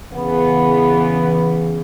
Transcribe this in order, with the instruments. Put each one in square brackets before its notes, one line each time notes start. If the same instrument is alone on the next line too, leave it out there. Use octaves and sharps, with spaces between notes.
[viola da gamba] E2 C#3 E3 [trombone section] B3